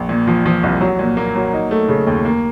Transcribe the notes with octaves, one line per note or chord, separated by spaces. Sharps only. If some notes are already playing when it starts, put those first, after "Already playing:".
Already playing: A#1
A#2
F3
F3
C2
F#3
A#2
A#3
F#3
D#4
A3
C#3
D#2
A#3